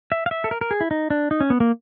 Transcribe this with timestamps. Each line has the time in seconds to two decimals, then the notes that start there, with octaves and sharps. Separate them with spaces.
0.12 E5
0.26 F5
0.31 E5
0.44 A4
0.51 A#4
0.61 A#4
0.71 G#4
0.81 E4
0.91 D#4
1.10 D4
1.31 D#4
1.41 C#4
1.50 B3
1.60 A#3